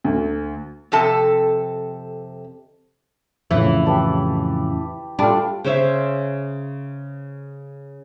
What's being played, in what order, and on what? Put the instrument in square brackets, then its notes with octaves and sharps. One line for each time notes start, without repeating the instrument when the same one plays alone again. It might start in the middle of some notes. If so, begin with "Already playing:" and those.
[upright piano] D2
[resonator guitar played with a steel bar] F2 C3 A4 A5
[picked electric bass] F2 A2 C#3 [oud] E3
[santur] G4 B4 A5
[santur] G3 A3 F4 [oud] D4
[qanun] C#3 C5 C#5 E5